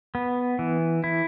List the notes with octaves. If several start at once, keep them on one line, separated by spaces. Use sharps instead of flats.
B3
E3
E4